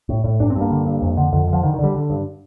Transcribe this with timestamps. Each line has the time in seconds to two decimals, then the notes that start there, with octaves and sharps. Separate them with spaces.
0.09 A2
0.24 A2
0.40 G2 D4
0.50 C4
0.55 G2
0.61 A#3
0.71 D3
0.86 G2
1.02 F2
1.17 D3
1.32 F2 D3
1.48 D3
1.53 F3
1.63 D3 D#3
1.74 D#3
1.79 D3 G3
1.95 D3
2.10 G2